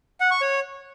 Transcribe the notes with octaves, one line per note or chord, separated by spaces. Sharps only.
F#5
C#6
C#5